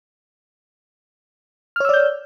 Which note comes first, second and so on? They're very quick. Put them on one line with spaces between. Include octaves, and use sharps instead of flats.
F6 C#5 E6 D5 G6